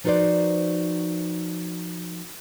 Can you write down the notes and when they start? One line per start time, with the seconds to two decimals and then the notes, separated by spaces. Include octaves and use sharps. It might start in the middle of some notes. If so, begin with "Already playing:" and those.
0.04 F3 D#4 F#4 B4 C5 D5